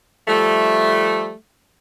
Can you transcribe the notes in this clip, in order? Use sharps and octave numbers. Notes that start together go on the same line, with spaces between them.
F3 G3 A3